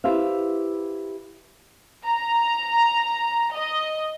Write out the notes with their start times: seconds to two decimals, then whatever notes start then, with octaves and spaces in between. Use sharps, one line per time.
0.04 E4 G4 B4 C5 E5 F5
2.04 A#5
3.54 D#5